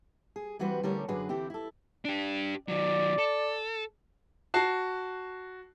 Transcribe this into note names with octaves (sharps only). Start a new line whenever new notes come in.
G#4
E3 G3 C4 F#4 B4 C5
D3 G3 A3 C#4 A#4 C#5
F#2 D3 D4 F#4 G#4 B4
D3 E3 C4 E4 G4
E4 A4
D4 G4
D#3 F#3 D5
A4
F#4 A5 C7